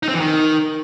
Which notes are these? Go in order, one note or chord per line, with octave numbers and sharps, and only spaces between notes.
D#4
C4
E3
D#3